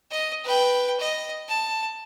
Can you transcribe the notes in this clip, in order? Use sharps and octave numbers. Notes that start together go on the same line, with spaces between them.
D#5
B4 G5
D#5
A5